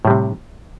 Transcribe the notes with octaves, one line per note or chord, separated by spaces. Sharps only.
A2 C3 G3